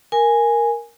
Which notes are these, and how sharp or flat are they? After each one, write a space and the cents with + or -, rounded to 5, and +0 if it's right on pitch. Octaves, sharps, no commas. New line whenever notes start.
A#4 +0 G#5 -5